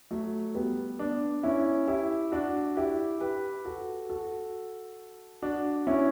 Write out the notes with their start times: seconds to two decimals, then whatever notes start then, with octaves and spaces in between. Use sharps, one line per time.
0.11 F#3 A3
0.55 G3 B3
0.99 B3 D4
1.43 C#4 E4
1.88 E4 G4
2.32 D4 F#4
2.77 E4 G4
3.20 G4 B4
3.65 F#4 A4
4.10 F#4 A4
5.42 D4 F#4
5.87 C#4 E4